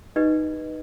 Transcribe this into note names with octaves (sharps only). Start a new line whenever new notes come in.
D#4 G4 B4 D#5